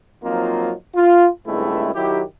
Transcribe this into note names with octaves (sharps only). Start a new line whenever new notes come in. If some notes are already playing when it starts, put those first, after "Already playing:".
F3 F#3 A#3 C4 D#4 F4
F4
C#2 G2 G#3 A3 C4 E4
D#3 F#3 E4 G4